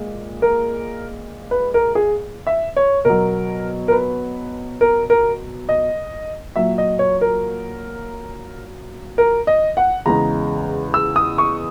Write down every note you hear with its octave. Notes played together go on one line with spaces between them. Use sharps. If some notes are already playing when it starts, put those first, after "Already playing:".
Already playing: A#2 G#3
A#4
B4
A#4
G#4
E5
C#5
B2 F#3 A#4
A#4
B4
A#4
A#4
D#5
A#2 F#3 E5
D#5
C#5
A#4
A#4
D#5
F#5
E2 C#3 G#3 A#5
E6
D#6
C#6